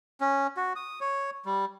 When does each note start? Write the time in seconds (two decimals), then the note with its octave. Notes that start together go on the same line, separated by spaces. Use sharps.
0.21 C#4
0.57 F#4
0.76 D#6
1.01 C#5
1.45 G3